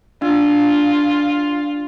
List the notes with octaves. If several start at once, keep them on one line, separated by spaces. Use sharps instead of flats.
D4 F4